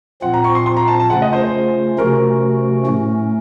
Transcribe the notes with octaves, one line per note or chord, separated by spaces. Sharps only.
A#2 F3 C4 F4 F#5
A#5
C#6
C6
C6
A#5
A5
A5
C#3 A3 C#4 F4 F#5
D#5
C5
C5
C3 F3 A3 C#4 F#4 A#4
A2 A3 C#4